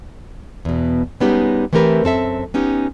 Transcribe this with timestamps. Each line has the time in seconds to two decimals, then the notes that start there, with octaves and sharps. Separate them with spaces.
0.65 E2 B2
1.20 G3 G#3 B3 C#4 D#4 G4
1.73 E3 A3 C4 G4 A#4 B4
2.04 F#2 C4 A4 E5
2.54 B3 C#4 D#4 G4